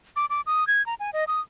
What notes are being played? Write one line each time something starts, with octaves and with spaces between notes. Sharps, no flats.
D6
D6
D#6
G#6
A#5
G#5
D#5
D#6